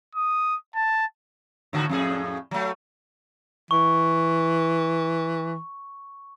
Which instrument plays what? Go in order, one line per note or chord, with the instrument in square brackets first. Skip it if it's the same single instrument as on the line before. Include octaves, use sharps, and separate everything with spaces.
[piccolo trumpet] D#6
A5
[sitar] A2 D3 F#4
F2 A2 G#4
F#3 A3
[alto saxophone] E3 [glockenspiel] C#6